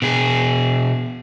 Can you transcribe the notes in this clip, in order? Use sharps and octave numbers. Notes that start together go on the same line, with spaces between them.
B2 G#4